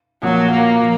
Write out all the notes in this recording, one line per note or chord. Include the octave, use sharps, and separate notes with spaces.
A#2 F3 F#3 A#3
A#3
F3